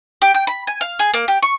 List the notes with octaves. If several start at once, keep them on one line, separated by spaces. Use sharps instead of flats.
G4
G5
B5
G#5
F5
G#4
A#3
G4
C#6